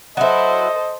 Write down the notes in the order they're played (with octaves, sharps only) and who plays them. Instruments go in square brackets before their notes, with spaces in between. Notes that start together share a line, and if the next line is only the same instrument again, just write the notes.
[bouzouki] F#3 E4 [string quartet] A4 C5 [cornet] D#5